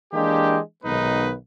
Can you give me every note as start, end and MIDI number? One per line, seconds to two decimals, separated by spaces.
0.13 0.58 52
0.13 0.58 56
0.13 0.58 58
0.13 0.58 62
0.13 0.58 67
0.84 1.32 35
0.84 1.32 51
0.84 1.32 56
0.84 1.32 59
0.84 1.32 63
0.84 1.32 71